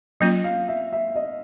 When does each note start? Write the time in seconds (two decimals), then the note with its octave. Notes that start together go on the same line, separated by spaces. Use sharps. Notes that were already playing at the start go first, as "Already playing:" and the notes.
0.20 F#3 A#3 C#4 F4 D#5
0.44 F5
0.68 E5
0.92 E5
1.15 D#5